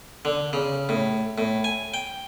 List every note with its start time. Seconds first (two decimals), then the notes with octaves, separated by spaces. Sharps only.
0.25 D3
0.53 C#3
0.89 A2
1.38 A2
1.64 G#5
1.94 G5